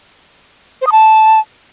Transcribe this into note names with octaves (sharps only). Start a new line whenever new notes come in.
C5
D#6
A5